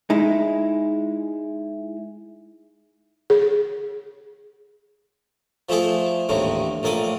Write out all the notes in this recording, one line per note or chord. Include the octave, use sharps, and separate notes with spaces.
G#3 D#4 E4
G#4
F3 A3 E4 G#4 D5
A1 D#2 A2 D3 G#3
A#1 A2 A#3 D5 D#6